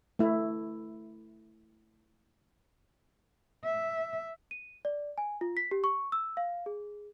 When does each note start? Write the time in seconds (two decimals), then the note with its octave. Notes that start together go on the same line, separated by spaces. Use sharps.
0.19 A3 E4
3.65 E5
4.51 D#7
4.85 D5
5.18 G#5
5.41 F4
5.57 B6
5.71 G4
5.84 C#6
6.12 E6
6.37 F5
6.66 G#4